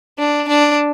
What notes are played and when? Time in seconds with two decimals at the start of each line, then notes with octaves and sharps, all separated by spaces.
0.19 D4
0.48 D4